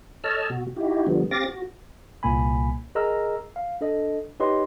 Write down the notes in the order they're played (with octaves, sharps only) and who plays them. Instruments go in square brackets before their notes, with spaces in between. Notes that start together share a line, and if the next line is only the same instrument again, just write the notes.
[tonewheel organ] A4 C#5 D#5 A5 E6 F6
B2 F#4
D#4 E4 F#4 G4
D3 F3 G3 B3
C4 G4 F5 D6 A6 A#6
F#4
[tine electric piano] C2 A#2 A#3 G#5 B5
G#4 A#4 D#5 A#5 E6 F6
F5
D4 A4 D#5
D#4 G4 B4 C#5 D#5 C6